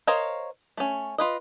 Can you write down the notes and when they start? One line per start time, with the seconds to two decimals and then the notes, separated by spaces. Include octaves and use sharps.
0.07 A#4 C5 C#5 D#5 F5
0.77 A3 C#4
1.18 F4 B4 D#5